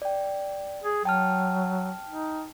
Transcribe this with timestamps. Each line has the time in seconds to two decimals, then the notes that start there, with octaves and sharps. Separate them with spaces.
0.02 D5 G5
0.84 G#4
1.05 F#3 G5 A5 F6
2.08 D#4